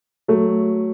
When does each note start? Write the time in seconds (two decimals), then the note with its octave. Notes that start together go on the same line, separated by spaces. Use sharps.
0.28 F#3 A3